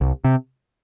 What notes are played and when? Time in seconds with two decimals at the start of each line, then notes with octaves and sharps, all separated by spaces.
0.01 C2
0.24 C3